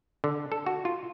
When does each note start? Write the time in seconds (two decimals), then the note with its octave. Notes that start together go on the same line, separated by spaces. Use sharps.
0.24 D3
0.52 A4
0.66 F#4
0.85 F4